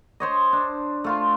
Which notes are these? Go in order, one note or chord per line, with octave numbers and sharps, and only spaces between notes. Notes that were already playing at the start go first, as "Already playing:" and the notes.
C5 C#5 D#5
D4
A3 F4 C6